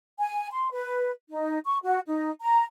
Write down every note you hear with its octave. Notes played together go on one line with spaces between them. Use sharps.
G#5
C6
B4
D#4
C#6
F#4
D#4
A#5